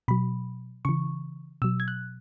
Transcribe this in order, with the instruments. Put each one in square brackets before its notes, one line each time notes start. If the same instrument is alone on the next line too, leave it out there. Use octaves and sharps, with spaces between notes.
[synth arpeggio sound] B2 F#3 B5
C#3 E3 C#6
B2 F#3 E6
G#6
F#6